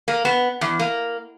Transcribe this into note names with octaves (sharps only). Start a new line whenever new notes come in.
A#3
B3
E2
A#3